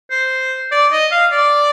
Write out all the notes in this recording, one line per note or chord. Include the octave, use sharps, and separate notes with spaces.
C5
D5
D#5
F5
D5